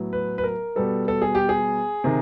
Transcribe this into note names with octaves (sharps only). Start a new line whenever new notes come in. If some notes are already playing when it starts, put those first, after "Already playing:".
Already playing: A2 F#3 B3
B4
B4
A#4
B2 G3 B3 A4
A4
G#4
G4
G#4
C3 D#3